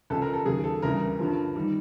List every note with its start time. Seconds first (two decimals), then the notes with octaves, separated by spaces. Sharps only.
0.10 C#2 C#3 F3 A4
0.22 A#4
0.33 A4
0.45 D#2 C#3 F#3 G#4
0.64 A4
0.82 D2 C#3 E3 G3 A#4
1.18 G2 D3 F3
1.56 D#3 G3